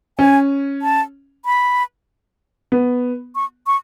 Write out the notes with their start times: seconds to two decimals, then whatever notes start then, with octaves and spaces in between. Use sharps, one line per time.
0.19 C#4 G#5
0.82 A5
1.45 B5
2.72 B3
3.35 C#6
3.67 C#6